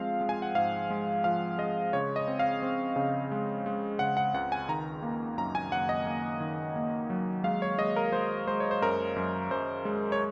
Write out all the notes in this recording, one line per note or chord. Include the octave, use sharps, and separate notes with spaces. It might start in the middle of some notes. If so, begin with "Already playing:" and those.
Already playing: F3 G#3 C4 F5
G#3
G#5
F#5
G#2 F5
G#3
F3 F5
G#3 D#5
C#3 C#5
D#5
C4
F5
C4
C#3
G#3
G#3
C#3 F#5
F#5
C#2 F#5
G#5
D#3 A#5
A#3
F#2 A#5
G#5
F#2 F#5
D#5
A#3
D#3
A#3
F#3
G#3 F5
C#5
G#3 D#5
A#4
G#3 C5
G#3 C5
C#5
C5
F#2 A#4
F#2
F#2 C5
G#3
C#5